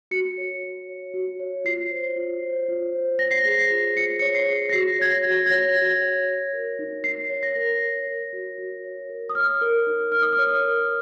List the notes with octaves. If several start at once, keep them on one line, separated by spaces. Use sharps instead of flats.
F#4 C#7
C#5
F#4
C#5
F#4
C#5
F4 C7
C5
F4
C5
F4
C5
C#5 A#6
C7
G#4 A#6
C7
F4
F4 C#7
C#5 C#7
C7
G#4
A#6
F#4 C7
C#5 G#6
A#6
F#4
G#6
C#5 A#6
F#4
C#5
C#5
A#4
D#4
D#4 C7
C#5
A#6
A#4
C#5
A#4
F#4
F#4
C#5
A#4
D#6
C#5 F6
A#4
D#4
D#4 F6
D#6
F6
C#5
A#4